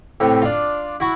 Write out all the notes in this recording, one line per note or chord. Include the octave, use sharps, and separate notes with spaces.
A2 C3
D4 F4
E4 F#4